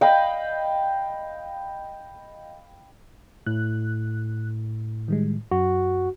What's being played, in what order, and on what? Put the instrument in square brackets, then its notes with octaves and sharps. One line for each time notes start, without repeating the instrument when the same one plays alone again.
[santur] D#5 F5 G5 B5
[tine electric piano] A2 [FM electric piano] F#6
[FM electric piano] D#3 G3 G#3
[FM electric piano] F#2 [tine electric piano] F#4